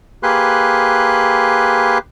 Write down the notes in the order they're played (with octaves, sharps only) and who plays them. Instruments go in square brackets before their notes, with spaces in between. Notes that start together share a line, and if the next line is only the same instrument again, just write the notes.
[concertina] A#3 G4 G#4 B4 C6 F#6